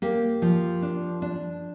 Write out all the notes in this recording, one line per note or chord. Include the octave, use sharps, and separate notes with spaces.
A#3 G4
F3
D4
D4